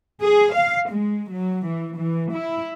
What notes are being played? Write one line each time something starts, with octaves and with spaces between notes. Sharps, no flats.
G#4
F5
G#3
F#3
E3
E3
E4